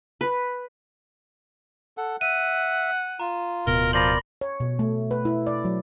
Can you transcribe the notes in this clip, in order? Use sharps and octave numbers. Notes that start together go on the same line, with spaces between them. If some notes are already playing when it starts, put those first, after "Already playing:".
B4
A4 F#5
E5 F#5 D#7
F4 A#5
D1 B2 A#4 G7
F3 A#4 D5 B5 C6 A#6 F#7
C#5
B2
A3
B4
E4
D5
F#3